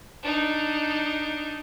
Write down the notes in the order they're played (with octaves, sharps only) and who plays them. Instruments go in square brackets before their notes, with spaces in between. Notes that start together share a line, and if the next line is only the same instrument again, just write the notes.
[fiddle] D4 D#4